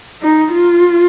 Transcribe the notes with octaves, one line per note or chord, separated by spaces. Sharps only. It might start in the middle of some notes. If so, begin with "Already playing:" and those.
D#4
F4